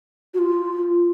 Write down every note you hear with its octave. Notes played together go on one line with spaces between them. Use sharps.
F#4
F4